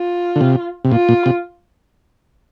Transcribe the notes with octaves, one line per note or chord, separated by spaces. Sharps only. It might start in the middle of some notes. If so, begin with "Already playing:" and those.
Already playing: F4
D3
C3
C3
A#2 F4
A#2
C3